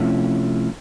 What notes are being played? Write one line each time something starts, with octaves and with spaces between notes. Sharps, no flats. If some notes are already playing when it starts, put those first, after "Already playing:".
Already playing: C3 F3 A3 C#4 E4